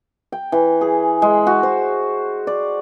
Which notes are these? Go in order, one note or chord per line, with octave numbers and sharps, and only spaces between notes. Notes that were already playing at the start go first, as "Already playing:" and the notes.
G5
E3
G#4
G#3
F#4
C5
D5